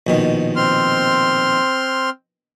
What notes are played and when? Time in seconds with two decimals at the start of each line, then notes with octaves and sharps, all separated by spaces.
0.07 A#1 B2 D#3
0.56 C4 C6 F6